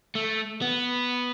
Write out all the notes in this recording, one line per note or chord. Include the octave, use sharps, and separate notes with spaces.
A3
B3